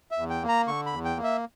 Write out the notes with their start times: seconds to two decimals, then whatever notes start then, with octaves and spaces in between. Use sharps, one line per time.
0.11 E5
0.17 E2
0.30 G5
0.43 A#3
0.48 A#5
0.68 D3 C#6
0.86 B5
0.93 E2
1.05 G5
1.17 A#3
1.24 E5